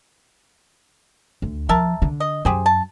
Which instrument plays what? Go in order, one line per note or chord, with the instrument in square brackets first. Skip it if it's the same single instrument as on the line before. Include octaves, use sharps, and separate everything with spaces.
[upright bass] D2
[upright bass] F3 [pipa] A#4 E5 A5
[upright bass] D3
[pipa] D#5
[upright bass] F#2 [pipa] G4 G#4 C5
[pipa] A5